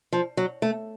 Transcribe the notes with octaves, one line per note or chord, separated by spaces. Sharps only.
F3
F#3
A3